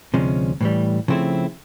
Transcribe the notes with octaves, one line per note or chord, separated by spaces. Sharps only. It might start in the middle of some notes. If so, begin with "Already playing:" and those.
D2 C3 F3 G#3 C#4
A2 E3 G3
C#3 F3 A3 C4 E4